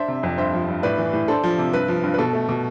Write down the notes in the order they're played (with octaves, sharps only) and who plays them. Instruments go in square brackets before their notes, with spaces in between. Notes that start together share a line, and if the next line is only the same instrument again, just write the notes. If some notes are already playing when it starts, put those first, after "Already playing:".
Already playing: [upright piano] D4 C5 E5
C3
F2
G2 C5 E5
F3
G2
A2 B4 D5
E3
A2
D4 A4 C5
F3
C3
G2 B4
F3
G2
B4
B2 A4
A3
B2